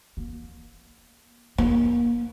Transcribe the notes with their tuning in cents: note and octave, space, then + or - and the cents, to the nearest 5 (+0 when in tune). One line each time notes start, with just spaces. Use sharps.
A#3 +40
A#3 +35